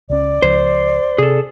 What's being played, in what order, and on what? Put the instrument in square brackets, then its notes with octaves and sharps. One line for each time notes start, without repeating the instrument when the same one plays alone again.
[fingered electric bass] C#2 C#4 [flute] D5
[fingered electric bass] C#2 F3 [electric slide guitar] C5
[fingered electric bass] C3 [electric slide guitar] G#4 A4